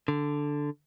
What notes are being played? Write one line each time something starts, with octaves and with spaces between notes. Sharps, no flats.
D3